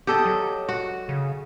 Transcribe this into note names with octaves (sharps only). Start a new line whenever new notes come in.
B3 G4 A4 D#5
F#3
F#4
C#3